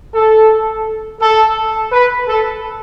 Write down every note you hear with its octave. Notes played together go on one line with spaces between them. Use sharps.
A4
A4
B4
A4